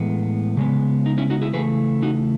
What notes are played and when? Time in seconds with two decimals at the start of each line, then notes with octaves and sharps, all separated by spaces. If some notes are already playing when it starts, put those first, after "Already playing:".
Already playing: A2 E3 G#3 B3
0.57 C#3 G#3 B3
1.06 D#4
1.18 C#4 E4
1.30 D#4 F#4
1.42 E4 G#4
1.54 C#3 E3 A3 G#4 B4
2.03 D#4 F#4